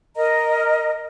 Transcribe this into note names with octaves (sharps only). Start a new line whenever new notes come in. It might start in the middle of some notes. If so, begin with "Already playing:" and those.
A#4 D#5 A#5